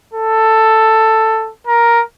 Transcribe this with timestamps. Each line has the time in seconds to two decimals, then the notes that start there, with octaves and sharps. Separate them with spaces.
0.13 A4
1.67 A#4